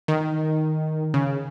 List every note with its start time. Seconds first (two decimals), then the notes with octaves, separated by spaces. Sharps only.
0.08 D#3
1.14 C#3